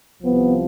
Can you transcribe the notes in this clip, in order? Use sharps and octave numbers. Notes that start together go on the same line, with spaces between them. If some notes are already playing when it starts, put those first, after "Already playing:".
C2 C3 F3 B3